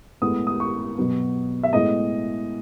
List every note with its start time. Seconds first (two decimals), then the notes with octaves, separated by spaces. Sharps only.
0.22 A2 G#3 B3 D#6
0.47 D#6
0.60 C#6
0.98 B2 F#3 B3
1.63 E5
1.73 A2 G#3 B3 D#5